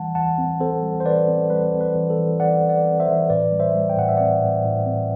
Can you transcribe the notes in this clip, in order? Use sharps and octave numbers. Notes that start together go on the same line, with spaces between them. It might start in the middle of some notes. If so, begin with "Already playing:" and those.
Already playing: E3 G3 F#5 A5
E3 F#5 A5
C4
C4 A4 C5
G3
C5
E3 B4 D5
C4
G3 B4
C4
B4
E3
A4
E3
E3 D5 F#5
E3
D5 F#5
C4
C5 E5
E3
A2 B4 D5
G3
C5 E5
G3
G5
A2 F#5
E5
C4 D5 F#5
A2
A2
C4